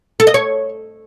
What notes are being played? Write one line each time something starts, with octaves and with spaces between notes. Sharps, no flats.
A4
D#5
C#5